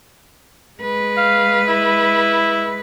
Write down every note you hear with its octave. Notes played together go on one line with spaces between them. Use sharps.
G#3 B4
F5
E4